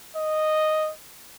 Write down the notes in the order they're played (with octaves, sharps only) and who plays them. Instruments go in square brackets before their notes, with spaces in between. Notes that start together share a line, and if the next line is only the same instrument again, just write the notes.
[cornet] D#5